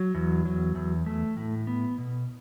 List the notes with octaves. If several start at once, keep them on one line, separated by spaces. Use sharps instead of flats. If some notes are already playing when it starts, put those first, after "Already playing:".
Already playing: F#3
E2
F#3
E2
A3
A2
B3
B2